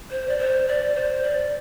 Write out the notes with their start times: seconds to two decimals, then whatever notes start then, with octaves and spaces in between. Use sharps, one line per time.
0.11 C5
0.29 D5
0.39 C5
0.68 D5
0.95 C5
1.23 D5